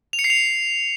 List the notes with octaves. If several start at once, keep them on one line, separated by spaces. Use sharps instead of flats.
F7
C#7
C7
F7